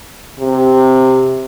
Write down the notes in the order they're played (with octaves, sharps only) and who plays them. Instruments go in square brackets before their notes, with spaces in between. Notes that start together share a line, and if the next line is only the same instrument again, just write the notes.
[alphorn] C3